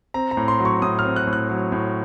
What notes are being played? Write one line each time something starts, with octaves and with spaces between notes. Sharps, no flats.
C4 A#5
A#5
A2
C6
F#3
C#6
A2 D#6
F6
C4
F#6
A2
F#6
F#3
A2